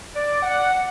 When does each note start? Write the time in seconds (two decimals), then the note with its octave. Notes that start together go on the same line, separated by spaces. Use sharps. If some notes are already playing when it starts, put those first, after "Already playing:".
0.15 D5
0.42 F#5